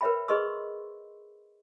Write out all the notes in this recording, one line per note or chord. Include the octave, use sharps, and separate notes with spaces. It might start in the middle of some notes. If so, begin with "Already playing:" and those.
A#4 B4 C#5 E5 G5 B5
G#4 B4 D#5 C6 C#6 E6